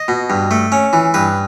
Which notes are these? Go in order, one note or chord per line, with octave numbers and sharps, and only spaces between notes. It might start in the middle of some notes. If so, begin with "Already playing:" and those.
Already playing: D#5
B2
G2
A3
C#4
E3
G2 B4